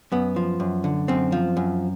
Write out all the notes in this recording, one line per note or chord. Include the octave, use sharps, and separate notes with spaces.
F#2 B3
F3
F#2
D3
F#2 C4
F3
F#2